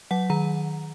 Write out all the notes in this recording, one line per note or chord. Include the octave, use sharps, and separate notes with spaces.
F#3 F#5
D#3 A#5